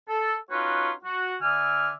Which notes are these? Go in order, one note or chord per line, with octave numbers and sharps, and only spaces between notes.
A4
C#4 D#4 F4 F#4 B4 C#5
F#4
D3 D5 E5 G#5 F6